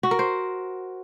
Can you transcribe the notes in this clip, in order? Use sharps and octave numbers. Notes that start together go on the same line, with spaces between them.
F#4
A#4
C5